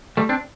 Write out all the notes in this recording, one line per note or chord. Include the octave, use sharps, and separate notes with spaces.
G3 A3
C4 D4